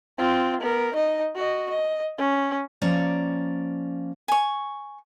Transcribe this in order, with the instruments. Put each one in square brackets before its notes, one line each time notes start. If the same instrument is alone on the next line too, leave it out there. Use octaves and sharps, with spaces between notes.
[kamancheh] C4 F4
B3 A#4
D#4 D#5
F#4 D#5
D#5
C#4
[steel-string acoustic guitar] F3 A#3 C#4 D5 A#5
[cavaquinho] G#5 C#6